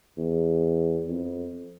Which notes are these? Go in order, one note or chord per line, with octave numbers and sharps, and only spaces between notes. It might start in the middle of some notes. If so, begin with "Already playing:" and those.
E2
F2